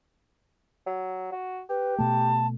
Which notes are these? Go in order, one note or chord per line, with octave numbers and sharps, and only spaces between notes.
F#3
F#4
G4 B4
B2 A3 A5